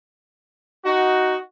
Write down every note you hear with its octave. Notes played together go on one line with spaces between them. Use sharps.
D#4 F#4